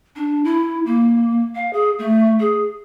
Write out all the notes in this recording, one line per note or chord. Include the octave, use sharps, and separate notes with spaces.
D4
E4
A#3
F5
G#4
A3
G#4